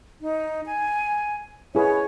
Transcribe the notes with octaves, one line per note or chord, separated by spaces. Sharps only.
D#4
G#5
E4 G#4 B4 C#5